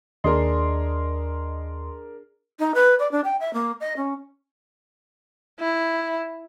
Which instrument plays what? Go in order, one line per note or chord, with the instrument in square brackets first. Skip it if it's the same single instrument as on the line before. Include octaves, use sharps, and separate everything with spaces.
[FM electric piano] D#2 D#5 C6 [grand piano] D4 G#4 A#4
[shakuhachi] D#4
B4
D5
D4
G5
E5
A#3
D#5
C#4
[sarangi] E4